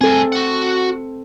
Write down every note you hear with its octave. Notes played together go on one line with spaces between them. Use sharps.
G2 C4 G#4 A4
F#4 F#5